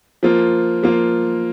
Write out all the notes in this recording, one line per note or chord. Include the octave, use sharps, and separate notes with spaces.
F3 A#3 F4
F3 A#3 F4